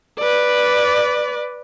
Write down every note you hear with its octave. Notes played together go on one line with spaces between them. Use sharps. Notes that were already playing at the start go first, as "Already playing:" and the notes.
B4 D5